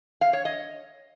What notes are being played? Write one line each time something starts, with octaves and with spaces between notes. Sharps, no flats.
F5
C#5
D#5